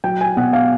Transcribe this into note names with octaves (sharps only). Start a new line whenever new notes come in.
F#3 G5
G#5
B2 F#5
F5